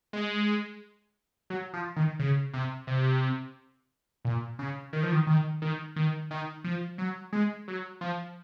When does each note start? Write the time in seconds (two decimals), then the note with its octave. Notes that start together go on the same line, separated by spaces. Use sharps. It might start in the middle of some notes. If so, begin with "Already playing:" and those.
0.13 G#3
1.50 F#3
1.73 F3
1.96 D#3
2.19 C#3
2.53 C3
2.87 C3
4.25 A#2
4.59 C#3
4.93 D#3
5.03 F3
5.12 D#3
5.27 D#3
5.62 D#3
5.96 D#3
6.31 D#3
6.64 F3
6.98 F#3
7.33 G#3
7.68 F#3
8.01 F3